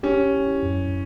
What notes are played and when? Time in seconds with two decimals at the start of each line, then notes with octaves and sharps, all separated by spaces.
0.03 C#4 G4
0.33 E4
0.63 F#2